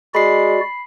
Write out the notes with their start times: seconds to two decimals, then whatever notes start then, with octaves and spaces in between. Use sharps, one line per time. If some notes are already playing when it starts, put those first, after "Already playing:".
0.15 G#3 F#4 D5 B5 C7